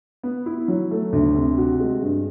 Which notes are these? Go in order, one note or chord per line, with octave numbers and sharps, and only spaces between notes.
B3
E4
F#3
A3
D2
C3
F#4
G#3
G2